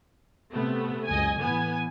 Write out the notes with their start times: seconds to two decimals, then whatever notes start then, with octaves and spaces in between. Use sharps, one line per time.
0.52 C3 A3 B3
1.07 F#1 C#2 D#5 G#5
1.41 A2 E3 B3 G#5